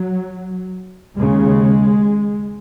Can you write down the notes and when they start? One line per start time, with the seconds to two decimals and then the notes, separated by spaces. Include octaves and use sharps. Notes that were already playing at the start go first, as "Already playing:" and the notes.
Already playing: F#3
1.17 D#2 C#3 G#3